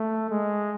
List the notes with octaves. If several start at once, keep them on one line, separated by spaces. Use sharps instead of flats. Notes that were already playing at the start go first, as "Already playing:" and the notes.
Already playing: A3
G#3